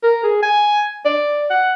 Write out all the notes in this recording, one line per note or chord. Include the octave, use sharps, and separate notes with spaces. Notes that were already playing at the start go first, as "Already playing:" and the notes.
A#4
G#4
G#5
D5
F#5